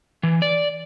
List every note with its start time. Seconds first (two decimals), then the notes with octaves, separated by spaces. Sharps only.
0.23 E3
0.42 D5